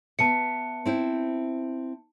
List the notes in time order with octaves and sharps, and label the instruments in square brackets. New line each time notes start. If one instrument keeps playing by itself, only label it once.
[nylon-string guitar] B3 B4 E5 [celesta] A5 C#7
[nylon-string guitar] C4 E4 C5